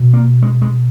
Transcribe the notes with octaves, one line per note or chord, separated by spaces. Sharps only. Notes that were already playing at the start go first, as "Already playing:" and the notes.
Already playing: B2
A#3
G#3
G#3